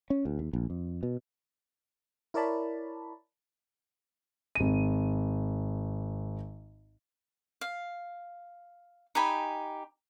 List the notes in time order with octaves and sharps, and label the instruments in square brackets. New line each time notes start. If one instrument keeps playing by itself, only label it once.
[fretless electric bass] C#4
D2
D#2
A#1
F2
B2
[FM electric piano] E4 A#4 C#5 D5 A5 B5
[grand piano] G#1 D#7
[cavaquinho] F5
D#4 G4 G#5 B5